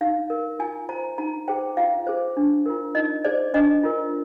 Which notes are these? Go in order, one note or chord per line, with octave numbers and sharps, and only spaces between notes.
D#4 F5
A#4
F4 G#5
C5 A#5
D#4 A#5
G#4 C5 G5
F4 F5
G#4 C5
D4
F4 A#4
D#4 D#5
G#4 C5 D5
D4 D#5
F4 A#4